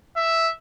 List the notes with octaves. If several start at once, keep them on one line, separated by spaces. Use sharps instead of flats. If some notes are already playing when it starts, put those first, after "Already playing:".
E5